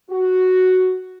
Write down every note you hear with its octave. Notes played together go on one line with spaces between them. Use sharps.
F#4